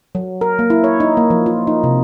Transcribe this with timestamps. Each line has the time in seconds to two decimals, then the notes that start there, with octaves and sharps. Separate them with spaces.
0.15 F#3
0.41 A#4
0.59 A#3
0.70 E4
0.84 C#5
1.00 D#4
1.17 A#3
1.30 F3
1.46 F4
1.67 D#4
1.84 C3